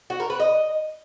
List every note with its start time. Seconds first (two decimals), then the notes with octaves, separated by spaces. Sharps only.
0.10 F#4
0.20 A#4
0.30 B4
0.40 D#5